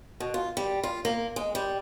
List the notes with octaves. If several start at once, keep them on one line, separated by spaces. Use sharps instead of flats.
B2
F4
G3
F4
A#3
G#3
G3